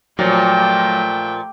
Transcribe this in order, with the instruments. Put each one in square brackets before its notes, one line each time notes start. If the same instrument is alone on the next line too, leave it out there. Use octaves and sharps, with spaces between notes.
[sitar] A#2 F3 [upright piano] F#3 [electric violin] A3 G5 [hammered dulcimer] G4